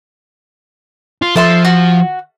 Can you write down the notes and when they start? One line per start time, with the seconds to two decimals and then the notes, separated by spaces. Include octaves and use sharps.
1.22 F4
1.36 F3 A4 E5 C6
1.65 F#4